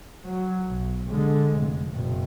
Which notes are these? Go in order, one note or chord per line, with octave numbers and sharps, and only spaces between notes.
F#3
B1
D3 G#3
F1
F#1 B2